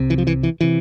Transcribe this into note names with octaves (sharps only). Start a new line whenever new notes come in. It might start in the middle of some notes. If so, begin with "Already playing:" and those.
Already playing: C2 C3
E3
F3
E3
E3
C3 E3